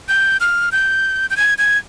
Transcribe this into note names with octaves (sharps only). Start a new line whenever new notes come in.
G6
F6
G6
G6
G#6
G#6